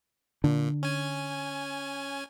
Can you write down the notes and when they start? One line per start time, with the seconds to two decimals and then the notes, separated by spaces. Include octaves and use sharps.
0.44 A#2 D3
0.83 C#4 G#5